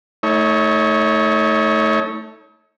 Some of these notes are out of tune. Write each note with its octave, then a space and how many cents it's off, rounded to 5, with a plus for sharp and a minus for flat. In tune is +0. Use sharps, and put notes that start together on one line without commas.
A3 +0 D#4 +40 C#5 +0